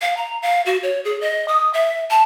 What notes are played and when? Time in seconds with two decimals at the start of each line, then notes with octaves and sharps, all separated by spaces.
0.02 F5
0.17 A#5
0.42 F5
0.66 F#4
0.83 C#5
1.05 G#4
1.21 D#5
1.48 D#6
1.74 E5
2.10 A5